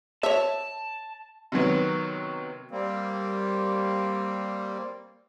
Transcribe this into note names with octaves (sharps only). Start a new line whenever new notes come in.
C#5 E5 A5
C3 D#3 F#3 B3
G3 A#3 C4